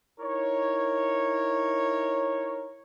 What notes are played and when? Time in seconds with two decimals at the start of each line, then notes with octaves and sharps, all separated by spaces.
0.20 D#4 E4 A#4 C#5